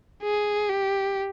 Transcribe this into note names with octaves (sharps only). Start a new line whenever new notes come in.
G#4
G4